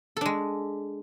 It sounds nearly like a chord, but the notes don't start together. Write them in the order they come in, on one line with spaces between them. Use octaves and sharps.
A4 D4 G#3